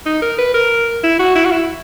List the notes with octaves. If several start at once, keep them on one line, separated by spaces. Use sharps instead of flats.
D#4
A#4
B4
A#4
E4
F#4
E4
F#4
E4